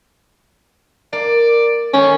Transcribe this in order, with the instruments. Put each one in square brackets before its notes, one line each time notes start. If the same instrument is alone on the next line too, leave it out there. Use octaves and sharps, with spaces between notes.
[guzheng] A#3 [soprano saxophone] D5
[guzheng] D#3 A3 A#3 [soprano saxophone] C#4